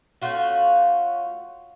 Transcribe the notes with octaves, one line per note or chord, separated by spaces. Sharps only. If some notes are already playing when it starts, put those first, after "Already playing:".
A3 C#4 F4 F#4